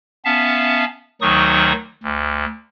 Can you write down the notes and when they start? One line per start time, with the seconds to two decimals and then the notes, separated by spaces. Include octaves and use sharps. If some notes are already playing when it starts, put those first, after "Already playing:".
0.25 B3 C#4 E5 F5 A5
1.21 D2 D#3 F#3 D#4 C#6 D#6
2.03 D2